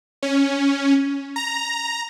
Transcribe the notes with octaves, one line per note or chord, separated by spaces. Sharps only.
C#4
A#5